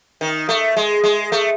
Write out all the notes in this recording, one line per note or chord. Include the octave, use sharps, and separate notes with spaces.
D#3
A3
G#3
G#3
A3